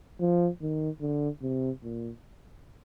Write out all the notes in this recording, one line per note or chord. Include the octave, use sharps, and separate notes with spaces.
F3
D#3
D3
C3
A#2